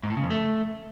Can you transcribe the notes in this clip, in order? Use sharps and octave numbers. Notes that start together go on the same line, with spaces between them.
G#2
A2
C#3
F2
A3